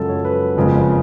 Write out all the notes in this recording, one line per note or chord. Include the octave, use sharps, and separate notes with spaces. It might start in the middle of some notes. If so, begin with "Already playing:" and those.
Already playing: F#2 C#3 F3 G#3 C#4 F#4 A4
C#5
B4
F#1 F2 C#3 G#3 B3